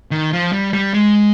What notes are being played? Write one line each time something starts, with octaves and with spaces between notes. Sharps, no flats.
D#3
F3
G3
G3
G#3